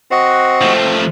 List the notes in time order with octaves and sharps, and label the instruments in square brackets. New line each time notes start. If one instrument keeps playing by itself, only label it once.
[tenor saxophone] C4 [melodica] F#4 D#5 F#5
[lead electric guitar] F3 A3